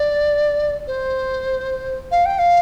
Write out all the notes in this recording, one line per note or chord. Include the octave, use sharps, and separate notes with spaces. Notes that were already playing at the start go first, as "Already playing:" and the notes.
Already playing: D5
C5
F5
G5
F5